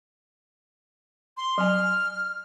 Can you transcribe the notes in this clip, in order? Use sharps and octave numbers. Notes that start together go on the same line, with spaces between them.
C6
F#3 G#5 F6